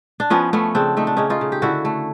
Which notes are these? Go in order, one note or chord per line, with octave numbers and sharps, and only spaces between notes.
D4
F3 B3 C#4
A3 B3 C#4
C#3 C4 D4
A3 D#4
D4
C#3 C#4 D#4
D#4 F4
C#3
G4
D3 E4 F#4
A3